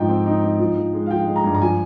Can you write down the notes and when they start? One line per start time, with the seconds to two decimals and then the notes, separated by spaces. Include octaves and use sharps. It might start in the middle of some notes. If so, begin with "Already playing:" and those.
Already playing: G#2 F3 D#4 G5
0.09 C4
0.26 D#4
0.43 D#4
0.60 F3
0.77 F3
0.93 G#3
1.06 F5
1.10 F3 G5
1.27 G#3
1.36 A#5
1.44 G2
1.55 A#5
1.62 F3 G#5